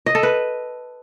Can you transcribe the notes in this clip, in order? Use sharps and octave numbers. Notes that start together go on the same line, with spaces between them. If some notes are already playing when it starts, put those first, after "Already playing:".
D#5
A4
B4